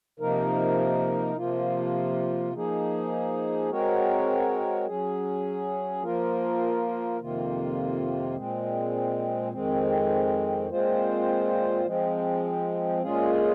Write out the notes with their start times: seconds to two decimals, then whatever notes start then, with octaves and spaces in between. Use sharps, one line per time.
0.20 C3 F3 A#3 D#4 A#4
1.36 C3 F3 A#3 F4
2.53 F3 A#3 D#4 G#4
3.69 G#3 C4 F#4 A#4 C#5
4.87 F#3 C#4 G#4
6.03 F3 A#3 F4 A#4
7.20 F2 C3 D#3 A#3 F4
8.36 A#2 G#3 C4
9.52 F2 D#3 G#3 C4
10.69 A#2 G#3 C4 F4 C5
11.85 F3 G#3 C4
13.02 A#2 G#3 C#4 F4 G#4